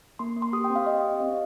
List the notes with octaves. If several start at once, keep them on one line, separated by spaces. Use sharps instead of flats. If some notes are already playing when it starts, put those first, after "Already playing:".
A#3 C6
A#3
C6
G4 D#6
G5
C4
F5
G4 D#5
G4
C4